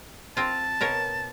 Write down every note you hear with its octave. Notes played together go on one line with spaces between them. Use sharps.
C4 F4 A5
B2 A#4 C#5